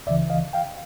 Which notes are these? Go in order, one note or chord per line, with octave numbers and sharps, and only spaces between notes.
C#2 C#3 E3 D5 E5
D#5 F5
F5 G5